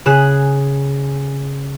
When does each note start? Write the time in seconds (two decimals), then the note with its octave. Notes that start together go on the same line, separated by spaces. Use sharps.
0.06 C#3 G#4 F#6 E7